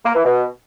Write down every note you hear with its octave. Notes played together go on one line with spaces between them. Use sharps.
A#3
E3
B2